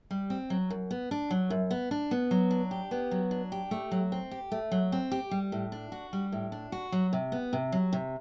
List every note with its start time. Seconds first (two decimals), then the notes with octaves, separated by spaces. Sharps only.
0.11 G3
0.30 C4
0.50 F#3
0.70 F#2
0.91 B3
1.11 D4
1.31 F#3
1.50 F#2
1.71 B3
1.91 D4
2.11 B3
2.31 F#3
2.51 D4
2.71 G4
2.91 B3
3.11 F#3
3.31 D4
3.52 G4
3.71 A3
3.91 F#3
4.12 C4
4.31 G4
4.52 A3
4.72 F#3
4.92 C4
5.11 G4
5.31 G3
5.52 A2
5.72 D4
5.92 F#4
6.13 G3
6.32 A2
6.52 D4
6.72 F#4
6.92 F#3
7.13 C3
7.32 B3
7.53 C3
7.72 F#3
7.93 C3